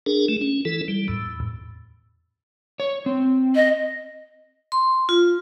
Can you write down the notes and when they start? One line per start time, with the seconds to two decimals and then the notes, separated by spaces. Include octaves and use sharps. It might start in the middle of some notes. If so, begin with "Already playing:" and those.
0.06 D4 G#4 A#4
0.28 A3
0.41 C#4
0.65 E3 E4 A4
0.88 G3
1.08 E2 A2
2.80 C#5
3.06 C4
3.55 D#5
4.72 C6
5.09 F4